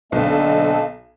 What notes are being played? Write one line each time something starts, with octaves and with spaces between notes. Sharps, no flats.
B1 D3 A#3 C4 A4 D#5